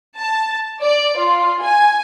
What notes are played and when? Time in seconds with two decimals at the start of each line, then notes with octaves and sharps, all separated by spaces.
0.17 A5
0.82 D5
1.18 F4
1.63 G#5